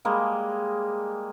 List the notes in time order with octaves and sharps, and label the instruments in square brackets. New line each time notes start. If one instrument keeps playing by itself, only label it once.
[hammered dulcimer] G3 G#3 A#3 G#4